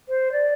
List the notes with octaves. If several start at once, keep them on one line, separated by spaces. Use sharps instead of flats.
C5
D5